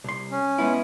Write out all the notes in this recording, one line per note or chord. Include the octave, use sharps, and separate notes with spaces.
C2 C6
C#4
G#3 B3 E4